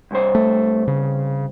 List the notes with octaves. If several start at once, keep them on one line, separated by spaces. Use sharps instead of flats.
C2 G2 C5
A3
C#3